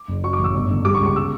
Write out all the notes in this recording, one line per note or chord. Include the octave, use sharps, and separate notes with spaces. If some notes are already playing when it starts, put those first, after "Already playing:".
Already playing: D6
F#1
F#3 C#6
D6
A1
E6
G1
D3
G3 D6
C#6
C#2
C#6
E6